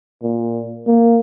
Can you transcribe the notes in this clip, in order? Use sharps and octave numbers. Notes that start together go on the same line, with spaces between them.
A#2
A#3